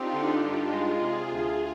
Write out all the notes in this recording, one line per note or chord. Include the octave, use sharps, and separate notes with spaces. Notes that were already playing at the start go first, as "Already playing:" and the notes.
Already playing: C4 D4 D#4 F4 G4
D3
D#4 G4
G2
G#3 F4 G#4
C3
D2